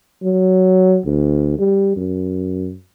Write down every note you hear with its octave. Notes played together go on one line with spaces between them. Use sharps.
F#3
D2
G3
F#2